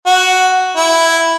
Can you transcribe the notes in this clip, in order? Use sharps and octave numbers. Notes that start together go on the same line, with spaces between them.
F#4
E4